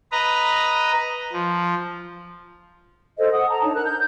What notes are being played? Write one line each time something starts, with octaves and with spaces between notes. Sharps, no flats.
B4 D#5 A#5
F3
A4 C5 D#5
F#5 D#6
A5 A#5
D4 D#4 C#5 A5
A#4 F#6
G6